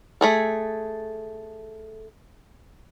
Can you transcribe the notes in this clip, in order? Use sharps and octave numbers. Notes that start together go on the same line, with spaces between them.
A3 G#4 A4